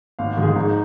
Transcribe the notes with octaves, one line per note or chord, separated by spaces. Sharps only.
G#1 F5
G#2 D#3
G#4
G#1 D#4